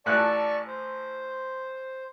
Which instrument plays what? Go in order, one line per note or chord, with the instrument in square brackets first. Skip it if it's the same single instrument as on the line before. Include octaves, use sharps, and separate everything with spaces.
[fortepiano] A1 A2 F#6 [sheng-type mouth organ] D5 A5 C#6
[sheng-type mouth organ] C5